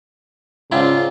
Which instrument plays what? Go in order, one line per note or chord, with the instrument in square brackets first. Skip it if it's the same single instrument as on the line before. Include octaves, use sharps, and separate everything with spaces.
[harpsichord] G#2 C4 D4 [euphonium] C#3 [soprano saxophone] F4